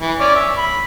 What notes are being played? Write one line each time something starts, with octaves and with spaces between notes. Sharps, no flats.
E3
C#4 D5
E5
B5